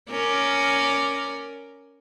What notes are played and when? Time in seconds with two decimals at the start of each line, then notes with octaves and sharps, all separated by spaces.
0.11 C#4 A#4 D5